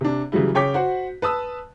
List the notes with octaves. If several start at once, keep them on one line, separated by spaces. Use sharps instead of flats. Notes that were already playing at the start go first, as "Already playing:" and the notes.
C3 D4
C#3 E3 F#3 G3 E4
C#3 C#5 G5 D6 B6
F#4 C5 F#5
B4 A5 D#6 E6